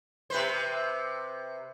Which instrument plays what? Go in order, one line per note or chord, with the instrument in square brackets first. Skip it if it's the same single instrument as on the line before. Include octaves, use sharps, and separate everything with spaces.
[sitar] C3 B4 C5